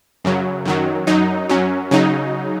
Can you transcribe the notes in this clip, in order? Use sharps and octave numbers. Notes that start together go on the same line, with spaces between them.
F#2 C#3 F#3
F#2 D#3 F#3
F#2 F#3 D#4
F#2 F#3 C#4
C#3 F#3 D#4